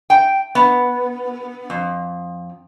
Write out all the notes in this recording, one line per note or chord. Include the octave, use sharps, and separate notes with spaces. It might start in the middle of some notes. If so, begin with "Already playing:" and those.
G5
B3
F2